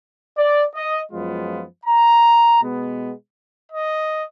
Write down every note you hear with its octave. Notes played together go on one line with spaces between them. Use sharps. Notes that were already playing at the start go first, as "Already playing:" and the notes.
D5
D#5
F#2 F3 G#3 B3 F4
A#5
B2 G#3 B3
D#5